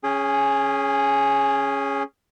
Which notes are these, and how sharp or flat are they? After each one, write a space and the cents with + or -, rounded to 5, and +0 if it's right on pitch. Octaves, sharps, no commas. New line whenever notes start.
C#4 +0 G#4 +0 G#5 -45